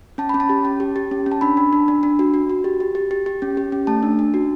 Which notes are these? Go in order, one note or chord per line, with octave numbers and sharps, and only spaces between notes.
C#4 A5
C#4 B5
A5
G4
C#4
G4
G4
C#4
C#4
A5
D4 B5
D4
D4
D4
D4
F#4
F#4
F#4
G4
G4
G4
G4
G4
C#4
G4
C#4
A3 A5
D4
D4
F#4